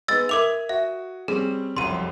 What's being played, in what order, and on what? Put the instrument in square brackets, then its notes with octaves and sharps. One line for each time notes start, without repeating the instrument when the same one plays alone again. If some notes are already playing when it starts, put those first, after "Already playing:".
[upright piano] G#3 B3 D#4 [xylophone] E6 A6
[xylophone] A#4 D6 F7 [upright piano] E5 D#6 G#6
[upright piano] F#4 [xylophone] E5
[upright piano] G3 C4 C#4 [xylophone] G#4
[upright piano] F1 C2 F#2 [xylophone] C6 D#7